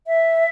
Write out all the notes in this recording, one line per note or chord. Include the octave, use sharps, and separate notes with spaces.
E5